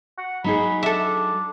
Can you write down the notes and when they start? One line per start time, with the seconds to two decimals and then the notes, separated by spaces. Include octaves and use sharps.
0.18 F#5
0.44 F#3 D#4 G#4 B5
0.83 D4 A4 E5